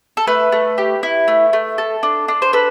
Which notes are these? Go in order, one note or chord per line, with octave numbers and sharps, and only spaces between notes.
A4
A3 B4
A3
G4
E4
A3
A3
A4
D4
D4
C5
A4 B4